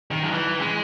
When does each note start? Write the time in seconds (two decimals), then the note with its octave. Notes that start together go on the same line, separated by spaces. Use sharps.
0.11 D#3
0.23 F#3
0.30 E3
0.59 G#3